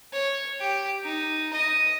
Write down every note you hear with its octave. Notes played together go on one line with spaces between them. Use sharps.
C#5
G4
D#4
D#5